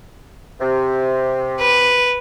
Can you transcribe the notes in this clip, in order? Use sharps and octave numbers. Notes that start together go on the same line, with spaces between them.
C3
B4